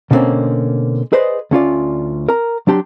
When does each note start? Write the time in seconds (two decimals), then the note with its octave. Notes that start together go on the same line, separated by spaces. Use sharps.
0.11 B2 D3 G3 A#3 C4 C#4
1.13 G#4 B4 C5 D5 D#5
1.51 D2 C#4 F4 D5
2.29 A#4 A#5
2.67 F#3 D4 G4 A#5 C6